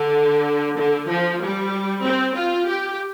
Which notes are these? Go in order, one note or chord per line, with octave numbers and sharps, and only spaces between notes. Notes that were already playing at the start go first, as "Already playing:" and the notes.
Already playing: D3
D3
F3
G3
C4
F4
G4